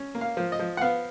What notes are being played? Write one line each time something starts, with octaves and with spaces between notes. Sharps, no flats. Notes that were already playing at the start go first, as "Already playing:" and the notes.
Already playing: C#4
A#3
F5
F3
D#5
F3
F#5
B3 F5